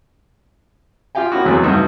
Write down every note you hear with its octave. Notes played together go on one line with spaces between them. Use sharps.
F4 G4 F5 G5 G#5
A#3 C#4 E4 F#4
E2 F#3 G#3 A3 B3 C4
G2 C#3 D#4 F#4 E5 E6